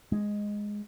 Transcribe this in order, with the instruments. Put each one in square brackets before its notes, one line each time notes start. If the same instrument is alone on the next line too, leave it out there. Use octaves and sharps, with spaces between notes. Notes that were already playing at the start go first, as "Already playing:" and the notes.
[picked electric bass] G#3